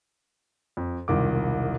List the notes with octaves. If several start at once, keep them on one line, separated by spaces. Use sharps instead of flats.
F2
E1 C2 D#3 F4 D6